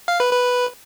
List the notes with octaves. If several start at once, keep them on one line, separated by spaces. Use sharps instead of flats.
F5
B4
B4